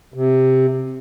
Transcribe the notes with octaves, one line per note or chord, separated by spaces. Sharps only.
C3